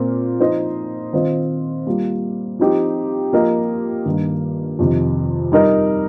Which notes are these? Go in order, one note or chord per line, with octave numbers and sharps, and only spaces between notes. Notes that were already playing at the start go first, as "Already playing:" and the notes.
Already playing: A#2 C4 F4 A#4
F3 D#4 C5 D#5
D#3 C4 F4 C5 D#5
G3 A#3 F4
F3 C4 D#4 G4
F3 A#3 G4 A#4 D#5
G2 D#3 A#3
F2 C3 D#3
G3 D#4 A#4 D#5